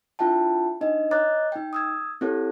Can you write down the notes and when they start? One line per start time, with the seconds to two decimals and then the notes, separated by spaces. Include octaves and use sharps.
0.19 D4 E4 F4 E5 G5 A5
0.81 D4 D#4 D#5
1.11 C#5 D#5 A#5 D6 F#6 A6
1.52 D#4 G5
1.73 D#6 E6 G#6
2.21 C4 E4 G4 A4 C#5